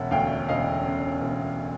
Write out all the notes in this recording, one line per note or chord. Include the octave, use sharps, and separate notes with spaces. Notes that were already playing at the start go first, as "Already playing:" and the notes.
Already playing: E1 C#3 E5 F#5
D2 F5 G5
E1 D#5 F5
C#3
E1